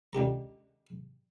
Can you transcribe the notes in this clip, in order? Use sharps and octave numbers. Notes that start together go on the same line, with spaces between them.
C#2 D3 G4 A#5